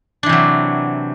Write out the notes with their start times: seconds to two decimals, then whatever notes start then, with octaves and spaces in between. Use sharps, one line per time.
0.23 D4
0.26 E3
0.29 C3
0.32 F#3